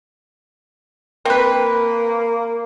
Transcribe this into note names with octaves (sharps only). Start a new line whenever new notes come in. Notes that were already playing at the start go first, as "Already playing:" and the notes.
A#3 C4 B4